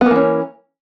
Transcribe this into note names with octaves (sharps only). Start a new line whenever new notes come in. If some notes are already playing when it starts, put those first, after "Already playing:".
E3 A#3 B3 C#4